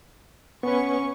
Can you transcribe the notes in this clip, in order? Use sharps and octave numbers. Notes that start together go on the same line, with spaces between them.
B3 C#4 B4 C#6